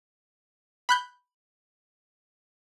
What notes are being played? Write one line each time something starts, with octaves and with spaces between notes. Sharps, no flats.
B5 F#6 G6